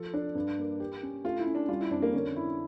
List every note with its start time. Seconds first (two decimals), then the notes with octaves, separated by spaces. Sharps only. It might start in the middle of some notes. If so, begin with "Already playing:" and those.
Already playing: F3 A4
0.14 D4
0.35 G2
0.58 A#3
0.80 G4
1.03 C#4
1.24 A3 F4
1.39 E4
1.46 C#4
1.55 D4
1.69 G3 F4
1.81 E4
1.91 F2 D4
2.02 A#3
2.13 D3 C#4
2.36 E4